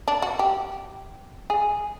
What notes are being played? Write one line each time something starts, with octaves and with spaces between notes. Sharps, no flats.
D4
F#4
G4
G#4